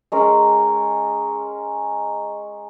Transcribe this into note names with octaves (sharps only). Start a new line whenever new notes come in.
G#3 C#4 A#4